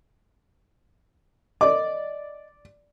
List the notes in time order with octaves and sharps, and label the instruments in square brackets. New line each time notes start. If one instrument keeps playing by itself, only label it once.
[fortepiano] D5 D6 [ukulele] D#5